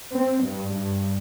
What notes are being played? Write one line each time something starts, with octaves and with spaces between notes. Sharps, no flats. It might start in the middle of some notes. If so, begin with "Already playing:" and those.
C4
G2
G2